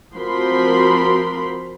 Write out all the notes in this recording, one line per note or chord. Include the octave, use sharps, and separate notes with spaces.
F3 C4 F#4 A#4 B5 C6